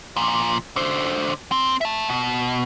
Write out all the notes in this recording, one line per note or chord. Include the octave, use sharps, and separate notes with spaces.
A#2 F3
D3 C5
C4
E5 A5
B2